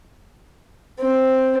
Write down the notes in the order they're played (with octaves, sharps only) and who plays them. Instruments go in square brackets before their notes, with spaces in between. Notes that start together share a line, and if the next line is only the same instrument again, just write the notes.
[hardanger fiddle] C4